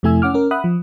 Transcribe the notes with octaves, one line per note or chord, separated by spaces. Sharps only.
F2 C3 A3 E4 G#5 E6
C#4 F#5 D6 F6
C#4 A#4
E5 F#5 B5 D#6 F#6
F3